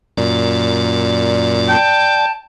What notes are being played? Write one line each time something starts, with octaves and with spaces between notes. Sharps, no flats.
F#2 A#2 D5
G5 A5